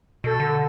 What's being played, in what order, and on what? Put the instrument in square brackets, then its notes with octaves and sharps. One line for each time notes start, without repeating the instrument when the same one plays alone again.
[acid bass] B2 [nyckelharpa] A4
[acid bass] D3